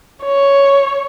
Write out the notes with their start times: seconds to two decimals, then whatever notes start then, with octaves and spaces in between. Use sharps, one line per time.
0.24 C#5